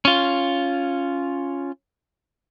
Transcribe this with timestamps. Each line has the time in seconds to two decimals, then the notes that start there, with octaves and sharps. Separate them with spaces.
0.05 C#4 F4